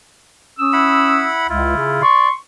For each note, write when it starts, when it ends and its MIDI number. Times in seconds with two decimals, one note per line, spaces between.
0.60 1.29 61
0.60 1.29 87
0.60 1.29 88
0.73 1.47 64
0.73 1.47 78
0.73 1.47 83
1.49 1.74 37
1.49 2.02 64
1.49 2.02 65
1.76 2.01 49
2.02 2.29 74
2.02 2.34 84
2.02 2.34 85